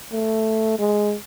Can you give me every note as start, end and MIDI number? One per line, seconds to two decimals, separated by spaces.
0.12 0.78 57
0.79 1.15 56